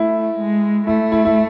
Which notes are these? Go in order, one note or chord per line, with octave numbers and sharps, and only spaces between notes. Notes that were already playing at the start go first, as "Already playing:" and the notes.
Already playing: A3 E4
G#3
A3 E4
E4
E4